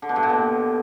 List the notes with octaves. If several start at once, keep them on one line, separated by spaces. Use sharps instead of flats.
D3
B2
G2
A#2
B2